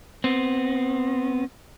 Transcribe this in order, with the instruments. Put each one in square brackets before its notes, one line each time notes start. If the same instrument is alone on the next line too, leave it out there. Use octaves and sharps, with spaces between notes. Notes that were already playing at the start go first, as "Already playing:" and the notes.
[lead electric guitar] B3 C4